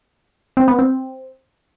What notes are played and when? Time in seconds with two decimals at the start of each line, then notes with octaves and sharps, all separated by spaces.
0.57 C4
0.68 B3
0.79 C4